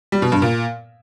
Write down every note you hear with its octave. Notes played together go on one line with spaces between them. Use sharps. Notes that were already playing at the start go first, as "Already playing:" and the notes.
G3
B2
G2
A#2